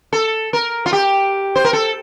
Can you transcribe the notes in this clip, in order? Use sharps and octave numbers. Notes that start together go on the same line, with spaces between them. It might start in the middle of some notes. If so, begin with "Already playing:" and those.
A4
A#4
F4
G4
C5
A#4
A4